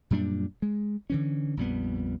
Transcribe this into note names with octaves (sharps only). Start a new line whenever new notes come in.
F#2 A#2 G3 D4
G#3
D3 E3 C#4
A#1 F2 G3 B3